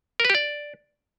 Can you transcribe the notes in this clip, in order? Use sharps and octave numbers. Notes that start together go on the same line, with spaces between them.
A#4
B4
G4
D5